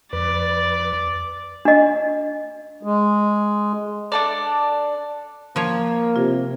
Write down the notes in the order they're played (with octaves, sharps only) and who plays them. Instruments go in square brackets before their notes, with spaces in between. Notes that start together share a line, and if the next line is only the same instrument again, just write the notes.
[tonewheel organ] F2 B4 [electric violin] D5
[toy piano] D4 D#5
[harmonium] G#3
[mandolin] D4 A4 D5
[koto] F3 C#5 [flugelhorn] A#3
[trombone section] C3 [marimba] F4